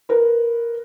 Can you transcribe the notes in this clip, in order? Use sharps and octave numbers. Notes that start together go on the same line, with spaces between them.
A#4 B4